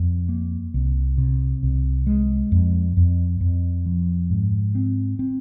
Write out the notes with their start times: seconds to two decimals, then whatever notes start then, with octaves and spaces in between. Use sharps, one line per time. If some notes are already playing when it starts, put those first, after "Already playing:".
Already playing: F2
0.29 A#3
0.74 C2
1.18 C3
1.63 C2
2.07 G#3
2.52 F2
2.97 F2
3.40 F2
3.86 F3
4.30 G#2
4.75 C4
5.19 C4